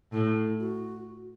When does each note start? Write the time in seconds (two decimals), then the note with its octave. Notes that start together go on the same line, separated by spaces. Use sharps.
0.12 A2 E4
0.59 F#4